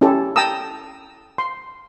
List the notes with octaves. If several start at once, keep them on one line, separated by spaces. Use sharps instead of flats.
C#4 E4 G4 A4
G5 A5 A#5 D#6 E6
C6